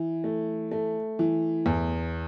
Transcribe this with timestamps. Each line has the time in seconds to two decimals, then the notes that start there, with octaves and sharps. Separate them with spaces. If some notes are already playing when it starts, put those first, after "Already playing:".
Already playing: E3
0.24 A3
0.71 A3
1.19 E3
1.66 E2